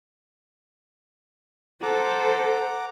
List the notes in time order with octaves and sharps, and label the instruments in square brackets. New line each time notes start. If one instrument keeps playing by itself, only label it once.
[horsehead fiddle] A4 C5 [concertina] F#5 A#5 D6